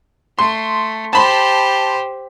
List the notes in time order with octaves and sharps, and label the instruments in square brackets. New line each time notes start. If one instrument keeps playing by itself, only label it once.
[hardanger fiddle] A3 [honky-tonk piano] C6
[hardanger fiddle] G4 C5 [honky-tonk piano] A5 B5 C6